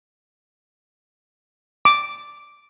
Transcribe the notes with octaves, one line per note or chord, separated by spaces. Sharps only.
D6